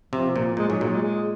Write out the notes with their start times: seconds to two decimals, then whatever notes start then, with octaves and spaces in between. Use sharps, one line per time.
0.12 C3 F3
0.36 A#2
0.57 A#2 G#3
0.69 G#2 F#3
0.80 A#2 F#3
0.91 G#3
1.02 G#3